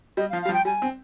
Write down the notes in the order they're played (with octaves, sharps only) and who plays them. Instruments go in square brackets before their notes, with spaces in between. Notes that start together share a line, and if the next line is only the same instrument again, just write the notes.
[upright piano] G3 [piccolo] D#5
[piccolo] F5
[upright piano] F3
[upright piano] G3 [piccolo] F5
[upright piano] F3
[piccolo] G5
[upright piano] G3 [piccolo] G#5
[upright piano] C4